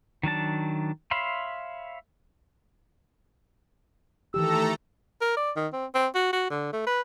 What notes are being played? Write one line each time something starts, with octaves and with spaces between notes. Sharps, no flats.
D#3 F#3 D4 A5
C#5 E5 F5 B5 C6
D#3 E3 A3 G4 A4 A#5 E6
A#4
D5
D#3
C4
C4
F#4
F#4
D3
A3
B4